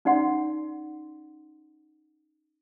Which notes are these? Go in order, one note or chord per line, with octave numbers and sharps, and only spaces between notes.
C#4 D#4 D5 F#5 C6